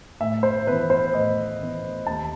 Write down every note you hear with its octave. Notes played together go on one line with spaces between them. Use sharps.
A2 E5
C5
E3 B3 B4
C5
A2 D#5
E3 B3
D#2 A5